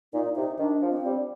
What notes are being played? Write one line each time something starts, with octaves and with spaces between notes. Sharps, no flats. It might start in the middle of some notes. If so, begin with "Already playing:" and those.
A#2 D#4
C3 D#4
D#3 D4
F3
C4
G3